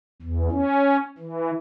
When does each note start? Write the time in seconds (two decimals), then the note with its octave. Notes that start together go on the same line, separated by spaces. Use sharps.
0.22 E2
0.52 C#4
1.18 E3